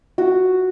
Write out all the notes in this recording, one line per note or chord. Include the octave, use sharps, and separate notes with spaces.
F#4